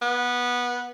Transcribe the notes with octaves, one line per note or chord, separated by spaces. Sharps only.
B3